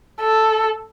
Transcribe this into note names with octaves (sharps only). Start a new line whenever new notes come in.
A4